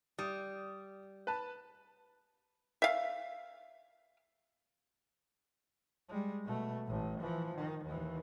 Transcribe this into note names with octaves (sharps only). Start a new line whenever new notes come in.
G3 D#6
B4 A5
E5 F5
G3 G#3
B2 A3
A1 A2
E3 F3
D#3
D#2 E3